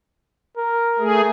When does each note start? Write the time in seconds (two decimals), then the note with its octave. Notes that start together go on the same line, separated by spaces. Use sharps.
0.57 A#4
0.99 A3 G#4